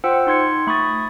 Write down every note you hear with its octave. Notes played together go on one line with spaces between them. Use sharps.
F4 C5 F#5 G5 E6
D#4 C6 G#6 C#7
A3 B5 C#6 D#6 A6